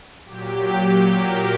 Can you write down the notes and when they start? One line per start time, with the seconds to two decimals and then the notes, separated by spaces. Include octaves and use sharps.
0.25 A#2 F#3 G4
1.06 A#4